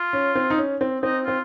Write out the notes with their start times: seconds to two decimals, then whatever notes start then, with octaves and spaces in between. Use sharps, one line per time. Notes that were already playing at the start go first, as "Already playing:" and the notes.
Already playing: F4
0.13 C#4
0.35 C4
0.50 D#4
0.58 C#4
0.81 C4
1.03 C4 D#4
1.25 C4 F4